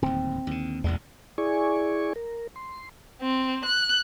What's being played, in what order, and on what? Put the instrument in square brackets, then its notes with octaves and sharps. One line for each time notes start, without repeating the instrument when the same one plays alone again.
[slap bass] D1 D#2 [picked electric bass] C4
[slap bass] D#2 D3
[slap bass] E1 A1 G#3 [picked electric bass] E2
[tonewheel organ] E4 G#4 D5 G#5 C#6
A#4
C6
[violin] C4
F#6